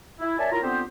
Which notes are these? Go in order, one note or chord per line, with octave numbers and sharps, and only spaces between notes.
E4
F#2 C#5 D5 E5 G#5 A5
F#3 E4 F4 A#4 A#5
D3 B3 C4 F4 G4 C5